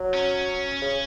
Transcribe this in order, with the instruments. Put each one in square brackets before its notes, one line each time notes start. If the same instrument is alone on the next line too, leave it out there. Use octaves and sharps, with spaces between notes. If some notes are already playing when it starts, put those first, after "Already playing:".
Already playing: [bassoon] F#3
[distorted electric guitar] C#4
[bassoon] C#3